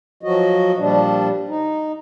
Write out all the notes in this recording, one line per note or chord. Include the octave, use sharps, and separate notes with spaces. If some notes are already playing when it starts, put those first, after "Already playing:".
F3 F#3 F#4 D#5
A#2 F3 G3 D4
D#4